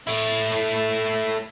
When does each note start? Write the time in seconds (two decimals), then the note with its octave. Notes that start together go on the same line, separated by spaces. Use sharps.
0.07 A3 E4